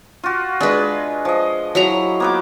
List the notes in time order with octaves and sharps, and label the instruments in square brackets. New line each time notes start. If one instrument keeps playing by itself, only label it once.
[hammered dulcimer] F4 F#4
[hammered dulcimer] G#3 [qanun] D4 B4
[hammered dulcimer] F3 D#5
[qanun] F#3 E4 A#5
[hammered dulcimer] A#3 B3 D6